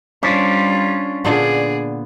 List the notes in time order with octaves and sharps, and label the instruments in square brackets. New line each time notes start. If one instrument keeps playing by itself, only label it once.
[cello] G3 F4 [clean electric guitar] C#4 D4 [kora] C5
[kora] A#2 D3 B3 [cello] G#4 D5